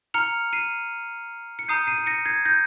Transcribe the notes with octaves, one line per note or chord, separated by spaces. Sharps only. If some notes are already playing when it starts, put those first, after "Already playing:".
A#5 F6 C#7 F7
C7 D#7
C#7
A#5 D#6 G6 C7 D#7
C7 D#7
D#7
A#6 C#7
G#6 C7
G6 A#6